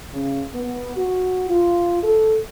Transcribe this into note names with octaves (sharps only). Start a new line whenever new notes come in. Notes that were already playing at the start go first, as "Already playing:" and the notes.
C#3
B3
F#4
F4
A4